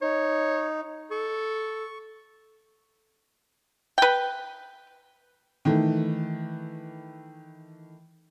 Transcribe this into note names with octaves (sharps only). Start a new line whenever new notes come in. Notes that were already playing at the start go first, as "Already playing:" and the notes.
D#4 C#5
A4 C#6
B4 G5
D#3 E3 A3